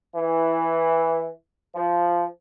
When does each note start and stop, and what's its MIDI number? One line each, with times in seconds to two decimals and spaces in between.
0.16 1.27 52
1.75 2.25 53